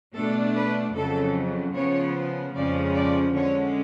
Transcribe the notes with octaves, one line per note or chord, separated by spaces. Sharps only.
B2 A3 D4 A4
B4
F2 C#3 F#3 A4
C#3 F3 B3 C#5
F2 C#3 F3 G#3 C#4 D5
D5
D3 G#3 C#4 C#5